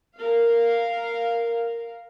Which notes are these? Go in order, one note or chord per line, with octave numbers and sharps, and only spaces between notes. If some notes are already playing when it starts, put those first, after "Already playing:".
A#4 F5